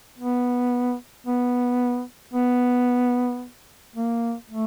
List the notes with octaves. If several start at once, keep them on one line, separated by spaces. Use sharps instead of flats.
B3
B3
B3
A#3
A3